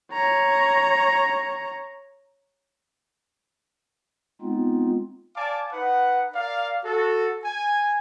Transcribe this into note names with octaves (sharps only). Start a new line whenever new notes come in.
C#5 A#5
G#3 B3 C4 D#4 F4
D5 F5 G#5 A5 D6
D#4 B4 F#5
A#4 D5 F5
F#4 A4
G#5